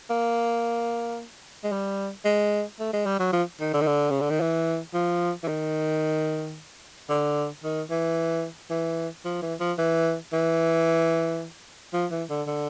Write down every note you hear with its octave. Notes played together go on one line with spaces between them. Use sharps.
A#3
G#3
G3
G#3
A3
G#3
G3
F#3
F3
D#3
D3
D#3
D3
C#3
D3
D#3
E3
F3
E3
D#3
D3
D#3
E3
E3
F3
E3
F3
E3
E3
F3
E3
D3
D3